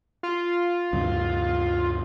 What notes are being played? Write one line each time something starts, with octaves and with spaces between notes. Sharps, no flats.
F4
D2 G2 C3